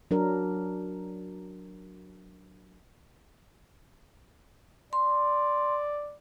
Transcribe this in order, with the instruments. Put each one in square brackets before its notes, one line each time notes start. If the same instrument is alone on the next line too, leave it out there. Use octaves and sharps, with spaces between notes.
[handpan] F#3 D4 A#4
[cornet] D5 [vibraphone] C6